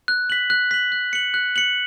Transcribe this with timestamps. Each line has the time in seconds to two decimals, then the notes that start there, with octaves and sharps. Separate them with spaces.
0.08 F#6
0.30 B6 F#7
0.50 F#6
0.71 B6 F#7
0.92 F#6
1.13 C#7 F#7
1.34 F#6
1.56 C#7 F#7